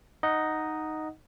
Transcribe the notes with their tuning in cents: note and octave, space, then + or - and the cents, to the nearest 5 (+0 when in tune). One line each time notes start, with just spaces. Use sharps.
D#4 +0 D#5 +0 F#5 +0